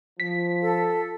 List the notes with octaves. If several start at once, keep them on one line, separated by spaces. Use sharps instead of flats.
F3 B6
A4